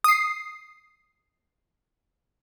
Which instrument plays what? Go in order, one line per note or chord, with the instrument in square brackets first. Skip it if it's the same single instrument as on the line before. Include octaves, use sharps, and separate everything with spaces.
[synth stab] D#6 C7